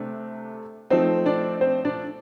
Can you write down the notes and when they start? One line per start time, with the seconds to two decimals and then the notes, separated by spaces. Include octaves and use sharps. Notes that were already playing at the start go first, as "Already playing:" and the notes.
Already playing: C3 A3 C4 D4
0.90 F3 A3 C4 D#4 C5
1.26 D4 D5
1.61 C4 C5
1.85 D4 D5